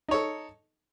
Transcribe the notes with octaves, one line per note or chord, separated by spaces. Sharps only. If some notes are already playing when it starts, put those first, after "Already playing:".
D#4 A4 C#5